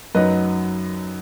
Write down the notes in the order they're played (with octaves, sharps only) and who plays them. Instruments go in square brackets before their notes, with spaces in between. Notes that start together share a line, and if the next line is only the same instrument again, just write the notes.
[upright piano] F#2 F#3 D#4 B4 D#5